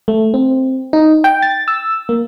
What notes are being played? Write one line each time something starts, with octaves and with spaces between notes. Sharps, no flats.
A3
C4
D#4
G5
A6
E6
A#3